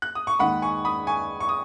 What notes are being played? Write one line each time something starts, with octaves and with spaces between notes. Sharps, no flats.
F#6
D#6
C#6
D#2 D#3 G#3 F#5 B5
G#5 C#6
B5 D#6
G#5 C#6
C#6
D#6